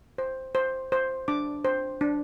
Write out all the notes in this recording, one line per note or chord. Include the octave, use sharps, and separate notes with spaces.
C5
C5
C5
D4 D6
C5
D4